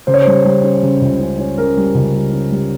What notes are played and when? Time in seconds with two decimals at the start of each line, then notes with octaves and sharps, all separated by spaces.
0.07 C#3 C5
0.14 C#5
0.22 G3 C5
0.44 G3
0.64 C#4
0.83 C#3
1.01 C#2
1.20 C#4
1.38 C#4
1.58 C#3 A#4
1.77 G3
1.95 C#2
2.14 G3
2.32 C#4
2.51 G3